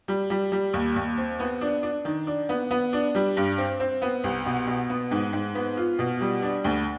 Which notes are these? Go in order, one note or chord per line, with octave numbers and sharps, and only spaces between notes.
G3
G3
G3
D#2
D#2
C4
B3
D4
D4
D#3
D4
B3
B3
D4
G3
G2
C4
C4
B3
C2
B2
B2
B3
G#2
G#2
B3
F4
B2
G3
D4
D2